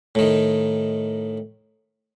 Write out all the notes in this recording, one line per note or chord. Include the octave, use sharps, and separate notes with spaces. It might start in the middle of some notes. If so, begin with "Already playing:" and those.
A2 D#3